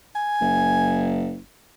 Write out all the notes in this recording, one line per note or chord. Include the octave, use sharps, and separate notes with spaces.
G#5
F#1